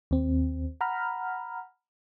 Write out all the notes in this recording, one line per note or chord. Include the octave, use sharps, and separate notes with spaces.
D#2 C4
F#5 A#5 B5 F6